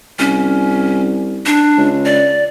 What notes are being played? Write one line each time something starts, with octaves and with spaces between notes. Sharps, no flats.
C2 C#4
D4
C#2
D5